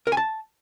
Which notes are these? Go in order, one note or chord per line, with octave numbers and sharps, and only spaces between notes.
A#4
G#5
A5